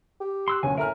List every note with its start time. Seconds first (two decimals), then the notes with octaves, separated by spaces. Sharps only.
0.20 G4
0.48 C6 E6 F#6
0.63 F#1 D2 C#4 G#5
0.78 A2 A#4 E5 G#5 A#5 F6